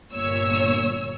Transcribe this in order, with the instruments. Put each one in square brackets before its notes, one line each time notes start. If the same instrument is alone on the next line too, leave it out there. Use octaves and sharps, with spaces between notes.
[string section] G1 A#2 C#5 E6